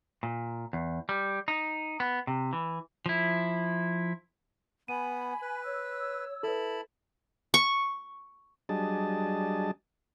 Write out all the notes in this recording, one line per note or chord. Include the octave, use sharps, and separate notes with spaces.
A#2
E2
G3
D#4
B3
C3
E3
F3 E4
B3 G#5 B5 D#7
B4
C#5 E6
E4 A4 B4 A5 B5
C#6
F#3 G3 D4 G#4 D#5 A5